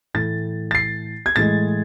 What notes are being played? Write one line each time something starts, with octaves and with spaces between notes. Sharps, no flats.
A2 E3 A3 A6
A6
C7
G#6
A2 E3 G#3 A6